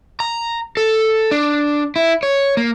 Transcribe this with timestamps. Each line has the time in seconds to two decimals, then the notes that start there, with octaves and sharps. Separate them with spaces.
0.20 A#5
0.77 A4
1.31 D4
1.96 E4
2.23 C#5
2.57 A#3